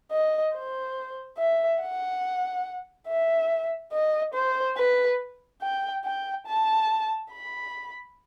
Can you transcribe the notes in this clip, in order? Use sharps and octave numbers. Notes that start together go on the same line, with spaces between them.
D#5
C5
E5
F#5
E5
D#5
C5
B4
G5
G5
A5
B5